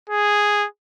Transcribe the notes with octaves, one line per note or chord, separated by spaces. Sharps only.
G#4